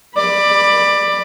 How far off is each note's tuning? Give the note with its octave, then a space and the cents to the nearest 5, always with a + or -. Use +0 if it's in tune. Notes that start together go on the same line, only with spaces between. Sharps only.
D5 +20 B5 +0